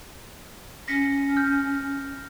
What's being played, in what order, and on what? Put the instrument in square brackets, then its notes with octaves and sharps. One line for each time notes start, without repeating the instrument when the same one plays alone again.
[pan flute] C#4 [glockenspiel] A#6 B6 C#7
[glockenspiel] F6 G6